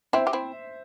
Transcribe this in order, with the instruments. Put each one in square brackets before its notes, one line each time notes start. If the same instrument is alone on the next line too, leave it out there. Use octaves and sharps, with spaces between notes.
[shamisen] C4 E4 [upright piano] C5 E5
[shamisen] G4
C4 E4